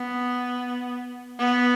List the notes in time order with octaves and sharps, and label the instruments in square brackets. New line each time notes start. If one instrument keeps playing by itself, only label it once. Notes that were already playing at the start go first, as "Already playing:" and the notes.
Already playing: [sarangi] B3
B3